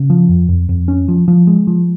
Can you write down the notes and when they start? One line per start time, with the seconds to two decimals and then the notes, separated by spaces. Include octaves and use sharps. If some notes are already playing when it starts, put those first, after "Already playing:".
Already playing: C#3
0.10 F3
0.29 F2
0.49 F2
0.69 F2
0.88 C#4
1.08 F3
1.28 F3
1.47 G#3
1.67 F3